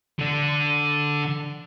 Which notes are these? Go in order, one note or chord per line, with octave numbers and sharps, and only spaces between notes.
D3 D4